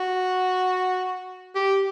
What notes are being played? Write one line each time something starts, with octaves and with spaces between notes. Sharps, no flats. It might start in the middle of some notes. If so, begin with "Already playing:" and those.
Already playing: F#4
G4